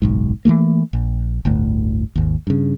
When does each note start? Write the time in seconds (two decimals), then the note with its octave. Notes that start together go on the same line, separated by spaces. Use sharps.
0.02 F#1 B1 G#2
0.45 E3 F3 A3 A#3
0.93 A#1
1.45 G1 D2 A2
2.16 G#1 D#2
2.47 G2 C#3